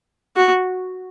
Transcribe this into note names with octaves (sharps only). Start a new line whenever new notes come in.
F#4